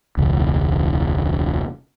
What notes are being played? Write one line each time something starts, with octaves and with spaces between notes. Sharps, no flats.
E1 C#2